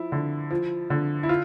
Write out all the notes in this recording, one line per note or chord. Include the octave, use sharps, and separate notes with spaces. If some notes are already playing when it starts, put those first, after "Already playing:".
Already playing: F3 E4
D3
F3
D3
E4
F4